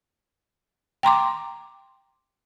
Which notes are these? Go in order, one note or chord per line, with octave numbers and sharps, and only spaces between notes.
G5 A#5 C6 D6